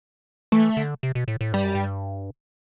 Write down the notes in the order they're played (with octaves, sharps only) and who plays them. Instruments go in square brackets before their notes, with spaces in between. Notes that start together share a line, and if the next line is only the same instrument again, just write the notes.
[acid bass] E3 [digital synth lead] A3
[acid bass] D3
C3
B2
A2
A2
[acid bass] G2 [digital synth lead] G3
[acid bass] F#2
G2